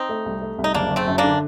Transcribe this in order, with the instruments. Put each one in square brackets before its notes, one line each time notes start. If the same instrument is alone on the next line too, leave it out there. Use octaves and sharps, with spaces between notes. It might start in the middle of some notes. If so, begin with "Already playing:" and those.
Already playing: [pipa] C4 D#4
[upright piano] A3
C2
A3
C2
[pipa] D#4
[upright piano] F#1 [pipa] A#3 D4
[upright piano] F#1
[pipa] A3 C4
[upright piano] F#2
[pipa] A#3 D4
[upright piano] D3